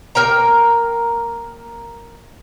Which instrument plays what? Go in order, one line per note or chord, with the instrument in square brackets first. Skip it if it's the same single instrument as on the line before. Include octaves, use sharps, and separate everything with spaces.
[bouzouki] A#3 A#4 G5 A#5